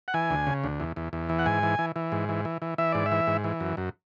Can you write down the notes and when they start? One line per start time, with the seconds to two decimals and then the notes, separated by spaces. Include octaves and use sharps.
0.08 F#5
0.14 E3 G#5
0.30 D2
0.47 C#3
0.64 D2
0.80 E2
0.96 E2
1.13 E2
1.29 E3
1.39 F#5
1.46 G#2 G#5
1.63 E3
1.79 E3
1.96 E3
2.12 G#2
2.29 E3
2.45 E3
2.62 E3
2.78 E3 E5
2.92 G#2 D5
3.06 E5
3.12 E3
3.27 G#2
3.44 E3
3.60 F#2
3.77 F#2